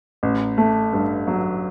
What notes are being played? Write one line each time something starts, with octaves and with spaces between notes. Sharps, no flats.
A1
A3
G2
F#3